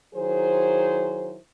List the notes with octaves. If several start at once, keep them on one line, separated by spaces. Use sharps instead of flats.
D#3 F#3 E4 G#4 C5